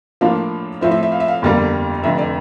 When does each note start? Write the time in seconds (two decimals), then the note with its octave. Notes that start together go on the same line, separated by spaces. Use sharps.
0.21 A2 F3 A#3 D4 F4 F5
0.81 A2 F3 C4 E5
0.91 E5
1.03 E5
1.12 F5
1.20 E5
1.28 F5
1.42 G1 F2 D3 G3 A#3
2.03 F1 F2 D3 E5
2.18 D5